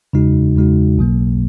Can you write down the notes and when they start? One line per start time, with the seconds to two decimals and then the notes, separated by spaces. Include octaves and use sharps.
0.13 E2 C#3 G#3 D#4 F#4
0.56 E2 C#3 G#3 D#4 F#4
0.98 B1 B2 F#3 A#3